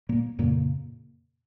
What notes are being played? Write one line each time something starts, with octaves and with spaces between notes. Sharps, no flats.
A#2 A#3
F2 A#2 C#3 A#3